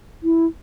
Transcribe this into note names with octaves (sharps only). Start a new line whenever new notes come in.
E4